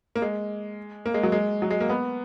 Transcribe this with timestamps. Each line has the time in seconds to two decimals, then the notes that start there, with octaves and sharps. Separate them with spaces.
0.16 A#3
0.22 G#3
1.06 A#3
1.14 G#3
1.23 F#3
1.32 G#3
1.62 F#3
1.70 G#3
1.81 A#3
1.89 B3